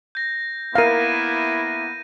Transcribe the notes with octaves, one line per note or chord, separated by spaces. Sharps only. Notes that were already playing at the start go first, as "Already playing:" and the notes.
G6 A#6
A#3 B3 E4 A#4 F5 A#6 D#7